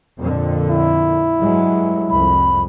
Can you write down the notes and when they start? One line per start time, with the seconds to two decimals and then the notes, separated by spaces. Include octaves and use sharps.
0.18 F2 A#2 D3
0.70 E4
1.40 G2 F#3 G#3
2.10 C2 F2 B5